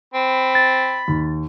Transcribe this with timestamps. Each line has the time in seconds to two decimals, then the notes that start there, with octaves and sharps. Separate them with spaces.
0.14 C4 B5
0.55 A6
1.08 D#2